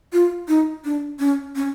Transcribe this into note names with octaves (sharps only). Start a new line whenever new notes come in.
F4
D#4
D4
C#4
C#4